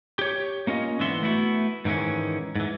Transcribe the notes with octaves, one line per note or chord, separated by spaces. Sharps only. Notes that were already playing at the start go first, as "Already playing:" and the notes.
G4 C#5
A#3 C#4 F4 D#5
G#2 D3 E3 B3 E5 C6
A3 B3 E4 F#4
G#2 D#3 E3 G#3 C#4
G#2 E3